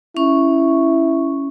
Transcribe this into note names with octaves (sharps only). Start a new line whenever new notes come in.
C#4 E4 C#6